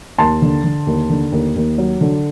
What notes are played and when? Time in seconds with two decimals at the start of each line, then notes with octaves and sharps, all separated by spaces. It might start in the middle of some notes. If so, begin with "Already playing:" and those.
0.18 D#2 A5 C6
0.42 D3
0.64 D3
0.87 D#2
1.10 D3
1.32 D#2
1.56 D#2
1.78 F#3
2.01 D3